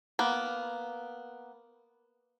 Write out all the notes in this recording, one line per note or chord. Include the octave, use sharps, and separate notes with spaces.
A#3 B3